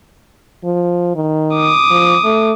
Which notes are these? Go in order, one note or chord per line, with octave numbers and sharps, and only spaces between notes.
F3
D#3
D6 D#6
F3
A3